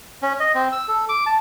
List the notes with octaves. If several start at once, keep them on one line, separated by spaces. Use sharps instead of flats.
C#4
D#5
C4
E6
A4
D6
A5